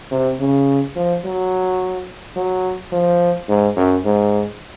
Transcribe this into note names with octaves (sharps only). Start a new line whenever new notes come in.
C3
C#3
F3
F#3
F#3
F3
G#2
F#2
G#2